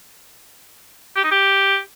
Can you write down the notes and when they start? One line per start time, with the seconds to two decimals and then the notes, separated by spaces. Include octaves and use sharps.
1.16 G4
1.24 D#4
1.31 G4